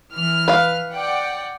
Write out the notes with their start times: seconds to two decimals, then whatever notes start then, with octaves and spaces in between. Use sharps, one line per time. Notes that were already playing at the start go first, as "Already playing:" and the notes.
0.13 E3 F6
0.48 B4 F5
0.93 D5 F#5 G5